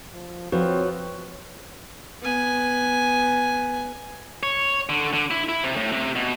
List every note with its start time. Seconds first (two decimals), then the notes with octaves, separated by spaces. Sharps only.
0.13 F3
0.52 F3 C4 F#4 B4 C#5
2.22 B3 G#5
4.43 C#5
4.89 D3
5.13 D3
5.31 E4
5.49 E4
5.64 C3
5.77 A2
5.92 C3
6.16 B2